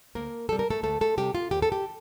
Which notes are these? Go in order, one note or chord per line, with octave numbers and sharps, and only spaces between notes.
D2 A#3 A#4
C3 G3 A4
A#4
A3 A4
D2 A3 A4
A3 A4
C3 G3 G4
F4
D#2 G4
A4
G4